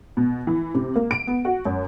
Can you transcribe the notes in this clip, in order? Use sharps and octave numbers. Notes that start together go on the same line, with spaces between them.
B2
E3
C3
A#3
D7
B3
F#4
F#2